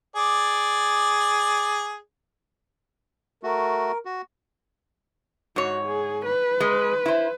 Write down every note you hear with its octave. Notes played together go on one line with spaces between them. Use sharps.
G#4 D5
A3 F#4 A#4
F#4
G#2 F#4 C#5
G#4
B4
G#3
E4 C5